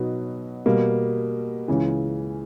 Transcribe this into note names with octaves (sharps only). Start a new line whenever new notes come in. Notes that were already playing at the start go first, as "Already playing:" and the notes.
Already playing: B2 F#3 B3 D#4
B2 G3 A#3
C#2 C#3 E3